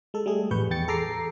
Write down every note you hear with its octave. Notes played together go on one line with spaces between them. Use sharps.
G#3 A4
G3 A3 G#4
A1 F2 B4 C#6 G6
E2 G5 A6 C#7
G#4 A4 A#5 D6 C7